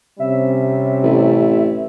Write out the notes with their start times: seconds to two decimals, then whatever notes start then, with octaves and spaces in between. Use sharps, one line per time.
0.20 C3 G3 C#4 E5
1.03 A1